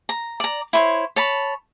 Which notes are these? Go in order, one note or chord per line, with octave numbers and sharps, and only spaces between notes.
A#5
D5 A#5
E4 C5 C#5
C#5 A5 B5